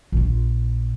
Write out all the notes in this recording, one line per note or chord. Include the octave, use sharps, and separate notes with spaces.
A#1 F4